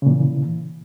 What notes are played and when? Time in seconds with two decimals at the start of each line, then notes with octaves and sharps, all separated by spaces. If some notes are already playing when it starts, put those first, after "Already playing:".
0.02 C#3
0.06 A#2
0.11 E3